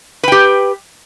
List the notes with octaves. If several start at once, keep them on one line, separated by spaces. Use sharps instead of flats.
G4 B4 G5